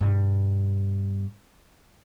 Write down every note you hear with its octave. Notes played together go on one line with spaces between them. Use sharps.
G2 B2